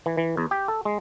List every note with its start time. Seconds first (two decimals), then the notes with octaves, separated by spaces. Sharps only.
0.06 E3
0.17 E3
0.37 E2
0.51 G4
0.68 A4
0.85 G#3